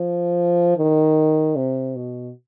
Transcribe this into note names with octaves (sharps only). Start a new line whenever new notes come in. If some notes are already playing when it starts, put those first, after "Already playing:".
Already playing: F3
D#3
C3
B2